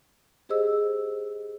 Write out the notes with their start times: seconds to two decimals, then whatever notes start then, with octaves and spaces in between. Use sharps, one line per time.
0.49 G4 G#4 C5 D#5 E6